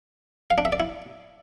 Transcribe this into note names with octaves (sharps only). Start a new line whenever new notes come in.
F5
D4
E5
D5
E4